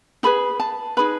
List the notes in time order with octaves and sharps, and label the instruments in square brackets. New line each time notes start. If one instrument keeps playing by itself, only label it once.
[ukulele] D#4 G#4 B4 B5
A5
D#4 G#4 B4 B5